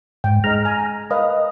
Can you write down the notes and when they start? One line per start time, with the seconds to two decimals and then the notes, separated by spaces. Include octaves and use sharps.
0.24 G#2 G5
0.44 G#3 D#5 A#5 F6
0.65 G#5
1.11 A#4 B4 D#5 F5